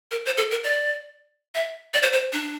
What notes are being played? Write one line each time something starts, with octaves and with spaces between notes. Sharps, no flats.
A#4
C5
A4
A#4
D5
E5
D5
C5
C5
D4